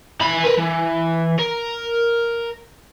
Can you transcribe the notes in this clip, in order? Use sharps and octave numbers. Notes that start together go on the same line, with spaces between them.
E3 B5
A#4 B4
E3
A#4